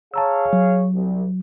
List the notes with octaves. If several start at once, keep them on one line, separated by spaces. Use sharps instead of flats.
G#4 C#5 F5 A5 A#5 E6
F#3
C2